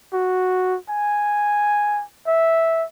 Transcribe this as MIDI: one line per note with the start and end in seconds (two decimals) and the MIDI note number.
0.14 0.77 66
0.89 2.03 80
2.27 2.85 76